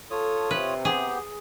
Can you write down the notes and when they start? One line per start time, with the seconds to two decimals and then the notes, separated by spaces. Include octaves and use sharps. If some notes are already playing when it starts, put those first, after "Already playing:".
0.11 F4 A4 C#5 D#6
0.51 C3 B4
0.85 B3 G4 G#4